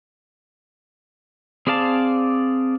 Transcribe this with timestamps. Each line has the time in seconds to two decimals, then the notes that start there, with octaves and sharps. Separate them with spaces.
1.67 C4 G#4 D5 F5 A5